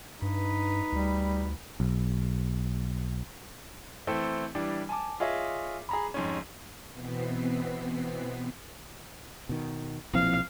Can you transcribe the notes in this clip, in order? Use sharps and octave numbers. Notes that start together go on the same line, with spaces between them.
G2 D#4 B4
D2 G3
B1
E3 A3 C4 A4
E3 G3 D4
G#5 A5 D6
F4 G#4 C#5 D#5 E5
G#4 A#5 B5
F2 G#2 C#4
B2 E3 B3 C4 B6 C7
B2 D#3
B1 A#2 F3 C4 E4 F5